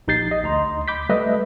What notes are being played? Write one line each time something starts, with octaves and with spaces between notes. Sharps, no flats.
A#1 D#4 G4 G6 A6 C7
D#5
D2 D#5 A#5 C6
B5 D6 G6 B6
G3 A3 B4 D#5 E5